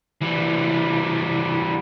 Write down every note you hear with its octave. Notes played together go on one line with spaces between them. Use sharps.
E3 G3